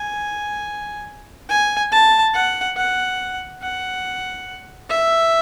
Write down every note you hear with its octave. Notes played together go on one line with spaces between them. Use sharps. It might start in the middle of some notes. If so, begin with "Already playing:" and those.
Already playing: G#5
G#5
A5
F#5
F#5
F#5
E5